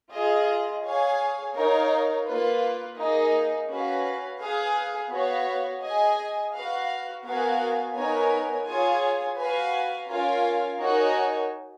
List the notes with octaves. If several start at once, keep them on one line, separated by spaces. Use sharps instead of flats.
F4 G#4 D#5
G#4 C#5 F5 G#5
D#4 A#4 C#5 F5
A#3 F4 B4
A#3 D#4 G#4 D#5
C#4 F#4 B4 F5
G#4 B4 F5 G#5
B3 F#4 C#5 F5
G#4 D#5 G#5
F#4 B4 F5
B3 F#4 A#4 F5 G#5
B3 D#4 A#4 C#5 G#5
F4 G#4 C#5 G#5
F#4 B4 F5 G#5
C#4 F4 A#4 F5 G#5
D#4 F#4 A#4 C#5 G#5